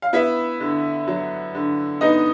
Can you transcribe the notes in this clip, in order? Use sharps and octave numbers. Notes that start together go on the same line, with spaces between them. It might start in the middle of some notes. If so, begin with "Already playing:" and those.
F5
B3 E4 E5
D3
F#3
D3
B3 D#4 D#5